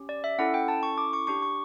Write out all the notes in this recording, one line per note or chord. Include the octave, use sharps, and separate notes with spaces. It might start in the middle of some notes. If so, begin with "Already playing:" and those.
Already playing: C#4 G4
D5
E5
C#4 E4 A4 F#5
G5
A5
C#6
D6
C#6
D4 G4 C#6
C#6